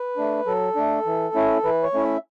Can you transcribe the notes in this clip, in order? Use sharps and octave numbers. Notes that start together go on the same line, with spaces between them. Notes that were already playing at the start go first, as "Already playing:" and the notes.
Already playing: B4
A3 D4
F#3 A4
A3 D4
E3
A3 C#4 E4
E3 B4
C#5
A3 C#4 E4
E5